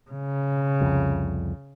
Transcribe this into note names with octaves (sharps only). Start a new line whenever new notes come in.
C#3
C2 F2